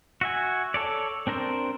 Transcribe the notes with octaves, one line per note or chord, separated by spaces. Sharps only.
F#4 E5 G#5
A4 C#5 D5
C4 D4 A#4 C5